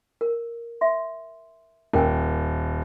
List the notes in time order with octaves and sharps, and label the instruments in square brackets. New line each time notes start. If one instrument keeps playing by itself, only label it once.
[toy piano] A#4
E5 C6
[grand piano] D#1 [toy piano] A#4 G5 G#5